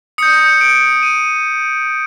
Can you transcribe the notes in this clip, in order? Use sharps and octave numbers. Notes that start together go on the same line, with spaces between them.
D#6 G6 C#7
D7
D#7